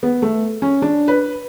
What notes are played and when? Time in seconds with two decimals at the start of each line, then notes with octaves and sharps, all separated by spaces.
0.03 B3
0.22 A3
0.62 C#4
0.82 D4
1.08 B4